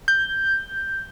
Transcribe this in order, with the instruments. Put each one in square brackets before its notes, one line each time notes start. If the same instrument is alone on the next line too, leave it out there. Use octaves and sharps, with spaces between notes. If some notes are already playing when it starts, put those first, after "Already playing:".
[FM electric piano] G6